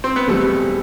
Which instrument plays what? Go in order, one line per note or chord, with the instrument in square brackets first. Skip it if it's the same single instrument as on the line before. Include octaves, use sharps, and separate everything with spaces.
[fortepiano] C4
B3
[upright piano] E2 B2 G3 C4 [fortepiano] A3